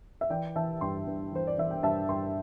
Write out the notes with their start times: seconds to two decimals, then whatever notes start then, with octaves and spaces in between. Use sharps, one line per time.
0.21 E5
0.30 E3 D5 G5
0.56 E3 E5 A5
0.81 G2 G5 C6
1.06 G2
1.32 E3 C5
1.47 D5
1.57 E3 E5
1.71 G5
1.83 G2 E5 A5
2.09 G2 G5 C6